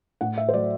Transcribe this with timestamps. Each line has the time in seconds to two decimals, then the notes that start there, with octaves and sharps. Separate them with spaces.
0.21 A2 F#5
0.38 E5
0.49 C5
0.54 F#3 A3 D5